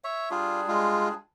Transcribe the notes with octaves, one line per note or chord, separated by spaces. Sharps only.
C#5 E5
G3 D4 F4 G#4
G#3 F4